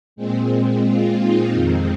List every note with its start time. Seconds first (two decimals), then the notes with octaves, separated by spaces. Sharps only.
0.16 A#2 G#3 C4
0.84 F4
1.18 D#4
1.52 F2 D#3 G#3 C4